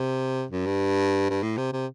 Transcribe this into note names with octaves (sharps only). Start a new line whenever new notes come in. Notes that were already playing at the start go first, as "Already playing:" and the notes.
Already playing: C3
F#2
G2
G2
A2
C3
C3